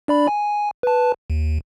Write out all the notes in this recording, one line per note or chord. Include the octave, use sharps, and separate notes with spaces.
D4 D5 B5
G#5
B4 A5
D#2